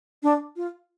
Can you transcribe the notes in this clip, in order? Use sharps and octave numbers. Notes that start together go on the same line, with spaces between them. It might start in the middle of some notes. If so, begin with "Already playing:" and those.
D4
F4